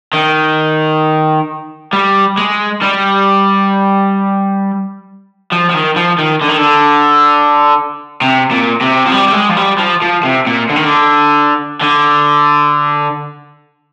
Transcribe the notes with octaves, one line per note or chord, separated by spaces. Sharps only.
D#3
G3
G#3
G3
F3
F3
D#3
F3
D#3
D3
D#3
D3
C3
A#2
C3
F3
G3
G3
G#3
F3
G3
F3
F3
C3
A#2
D3
D#3
D3
D3